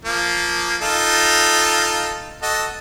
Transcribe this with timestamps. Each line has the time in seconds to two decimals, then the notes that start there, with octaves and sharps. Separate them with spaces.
0.05 F3 A#3
0.81 D#4 F4 A4
2.42 F#4 A4 D#5